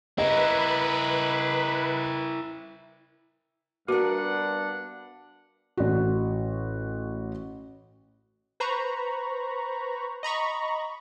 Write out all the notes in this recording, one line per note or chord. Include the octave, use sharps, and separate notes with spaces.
E4 A#4 B4 D#5 B5
G2 B3 D4 F#4 A#4 F#5
A1 F#4
B4 C5 A#5 B5 C#6
D#5 A#5 B5 C#6